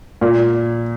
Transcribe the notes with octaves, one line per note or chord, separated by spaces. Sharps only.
A#2